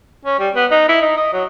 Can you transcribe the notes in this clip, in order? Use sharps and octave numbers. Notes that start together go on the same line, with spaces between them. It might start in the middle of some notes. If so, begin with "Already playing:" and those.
C#4
G3
B3
D#4
E4
D#4
D#5
F#3